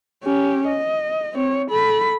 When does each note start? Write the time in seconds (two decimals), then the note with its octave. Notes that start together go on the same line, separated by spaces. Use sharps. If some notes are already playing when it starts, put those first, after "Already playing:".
0.24 C#4 G4
0.68 D#5
1.34 C4 C#5
1.71 A4 B5